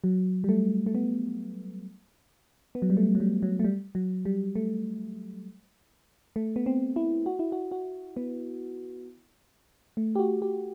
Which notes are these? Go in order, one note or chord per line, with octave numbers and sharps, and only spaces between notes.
F#3
G3
A3
A3
B3
B3
F#3
G3
A3
F#3
G3
F#3
A3
G3
F#3
G3
A3
A3
B3
C4
E4
F#4
E4
F#4
F#4
B3
A3
G4
F#4
G4